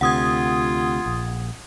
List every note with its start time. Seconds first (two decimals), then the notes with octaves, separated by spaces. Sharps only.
0.01 D2 C3 F4 F#5 D#6 G#6
1.06 A#1